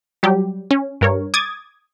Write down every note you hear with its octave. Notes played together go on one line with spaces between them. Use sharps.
F#3 G3 G4
C#4
G2 A#4 C#5
D6 D#6 G#6 A6